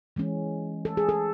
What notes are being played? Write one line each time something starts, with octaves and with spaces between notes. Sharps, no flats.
E3 G#3 C#4
A4
G#4
A4